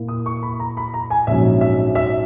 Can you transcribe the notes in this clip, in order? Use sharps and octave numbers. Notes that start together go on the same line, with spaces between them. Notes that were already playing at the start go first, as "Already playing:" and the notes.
Already playing: A#2 A#3 E4
D#6
C#6
B5
A#5
B5
A#5
G#5
A#1 G#2 F#3 C#4 E5
E5
E5